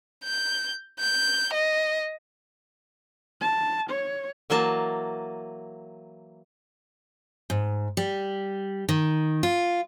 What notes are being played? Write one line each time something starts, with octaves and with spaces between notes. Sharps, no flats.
G6
G6
D#5
A5
C#5
E3 F#3 A#3 A5
G#2
G3
D#3
F4